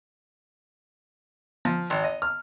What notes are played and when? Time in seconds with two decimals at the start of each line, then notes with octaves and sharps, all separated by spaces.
1.65 F3
1.90 G#1
2.04 D#5
2.22 F6